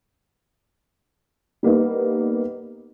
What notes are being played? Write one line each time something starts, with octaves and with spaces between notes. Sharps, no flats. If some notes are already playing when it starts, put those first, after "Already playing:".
G3 A#3 B3 D#4